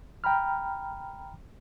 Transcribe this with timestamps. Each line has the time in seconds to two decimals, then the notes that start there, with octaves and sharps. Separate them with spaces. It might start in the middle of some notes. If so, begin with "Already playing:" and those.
0.24 G5 A#5 B5 F6